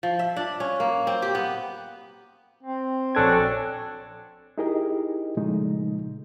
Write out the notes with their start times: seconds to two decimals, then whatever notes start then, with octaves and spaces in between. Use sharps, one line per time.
0.03 F3
0.19 E5
0.37 D4
0.60 C#4
0.80 A#3
1.07 C4
1.22 G4
1.35 B3
2.63 C4
3.15 A#1 C#4 D4 F#4 A4 G#6
4.58 D#4 E4 G4 G#4 A#4 D#5
5.37 A#2 C#3 F3 G#3 A3 D#4